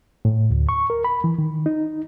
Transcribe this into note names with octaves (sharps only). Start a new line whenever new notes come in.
A2
D2
C#6
A#4
B5
E3
D#3
D#4